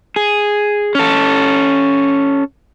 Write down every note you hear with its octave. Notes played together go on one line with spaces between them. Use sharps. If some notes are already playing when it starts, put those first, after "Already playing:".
G#4
C#4 A4